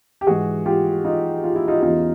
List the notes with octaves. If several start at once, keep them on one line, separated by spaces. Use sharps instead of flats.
G4
G#2 E3 F#4 G#4
F4 G4
D#4 F4
F4
E4
D#4 F4
E2 C#3 E3 D#4 F4